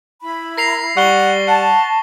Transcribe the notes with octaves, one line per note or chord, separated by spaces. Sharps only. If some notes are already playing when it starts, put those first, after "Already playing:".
E4 B5
A#4 A#6 C7 F7
G3 F#5 C#6 G7
F#5 A5